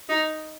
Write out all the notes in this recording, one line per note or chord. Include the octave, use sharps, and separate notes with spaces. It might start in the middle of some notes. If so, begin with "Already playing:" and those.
D#4